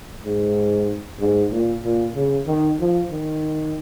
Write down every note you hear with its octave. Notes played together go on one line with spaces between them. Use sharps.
G#2
G#2
A#2
A#2
C#3
D#3
F3
D#3